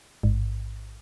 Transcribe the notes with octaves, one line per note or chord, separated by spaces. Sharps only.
A1 G#2